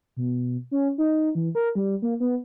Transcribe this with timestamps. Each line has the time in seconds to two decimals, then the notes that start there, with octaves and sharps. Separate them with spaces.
0.17 B2
0.71 C#4
0.98 D#4
1.35 E3
1.55 A#4
1.75 G3
2.02 A#3
2.20 B3